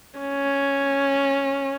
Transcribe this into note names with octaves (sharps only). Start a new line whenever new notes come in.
C#4